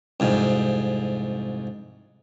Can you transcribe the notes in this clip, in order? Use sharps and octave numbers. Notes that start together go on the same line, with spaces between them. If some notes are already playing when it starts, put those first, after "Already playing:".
C2 F2 G#2